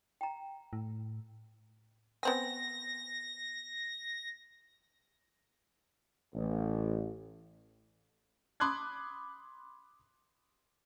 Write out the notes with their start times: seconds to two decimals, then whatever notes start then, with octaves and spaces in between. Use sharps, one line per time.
0.21 G5 A#5
0.73 A2
2.23 B3 C4 G#5 A#6
6.34 A1
8.60 B5 C6 D6 D#6 F#6 G#6